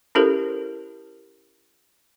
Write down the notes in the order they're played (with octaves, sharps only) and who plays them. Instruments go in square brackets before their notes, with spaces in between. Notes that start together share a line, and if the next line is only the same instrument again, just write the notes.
[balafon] C#4 E4 G4 A4 A#4 C5